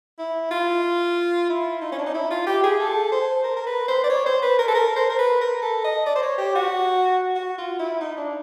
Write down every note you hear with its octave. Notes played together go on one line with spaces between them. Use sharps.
E4
F4
E4
D#4
C#4
D4
D#4
E4
F4
G4
G#4
A4
C5
A#4
A#4
B4
C5
D5
C#5
C5
B4
A#4
A4
A#4
C5
A#4
B4
A#4
A4
D#5
D5
C5
C#5
G4
F#4
F#4
F4
E4
D#4
D4